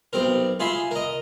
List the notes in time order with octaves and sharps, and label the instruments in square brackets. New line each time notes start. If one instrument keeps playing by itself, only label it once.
[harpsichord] B1 C4 A#4
F4 G#4 E5 B5 C6
A#4 D#5